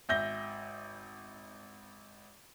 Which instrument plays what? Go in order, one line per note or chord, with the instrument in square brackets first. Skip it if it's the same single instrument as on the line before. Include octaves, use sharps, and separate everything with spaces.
[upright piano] G#1 E5 G6 A#6 G7